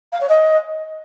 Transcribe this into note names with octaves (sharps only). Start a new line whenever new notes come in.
F5
C#5
D#5